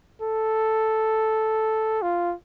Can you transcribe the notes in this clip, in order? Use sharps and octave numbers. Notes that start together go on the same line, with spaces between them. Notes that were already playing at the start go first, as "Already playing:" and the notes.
A4
F4